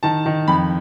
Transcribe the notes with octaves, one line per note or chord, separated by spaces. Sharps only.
D#3 A5
D#3
F2 B5